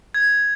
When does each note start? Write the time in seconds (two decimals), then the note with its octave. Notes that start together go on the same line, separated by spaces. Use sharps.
0.14 G#6